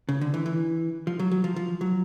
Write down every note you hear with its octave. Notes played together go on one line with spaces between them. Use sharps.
C#3
D3
E3
E3
F3
F#3
F#3
F3
F3
F#3